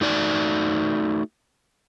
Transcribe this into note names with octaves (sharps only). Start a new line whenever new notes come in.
A3 D#4 F#4 D5